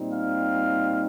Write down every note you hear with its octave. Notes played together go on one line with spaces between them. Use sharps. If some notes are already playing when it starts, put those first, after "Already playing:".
Already playing: A#2 G3 C4 D#4
F5